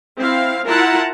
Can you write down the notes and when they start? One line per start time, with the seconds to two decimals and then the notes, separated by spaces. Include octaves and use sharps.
0.19 C4 E4 F5
0.65 E4 F4 A#4 F#5 A5 A#5